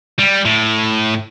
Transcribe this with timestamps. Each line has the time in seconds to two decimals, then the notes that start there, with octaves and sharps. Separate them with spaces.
0.19 G3
0.45 A2